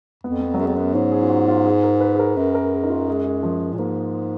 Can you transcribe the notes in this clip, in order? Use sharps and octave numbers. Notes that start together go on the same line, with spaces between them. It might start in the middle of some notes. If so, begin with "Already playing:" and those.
F2 B3
B3
F#3
F#2 G#3
F2
F#2 B3
G#2 C#4
G#4
F4
F#4
F4
G#4
A#4
B4
G#4
A#4
F#2 B4
A#4
G#4
D#4
F4
G#3
G#3
F3
A#2
G#2 A#3